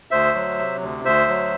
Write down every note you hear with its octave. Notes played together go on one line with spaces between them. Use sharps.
D2 C5 E5
F#3
C3
D2
D2 C5 E5
F#3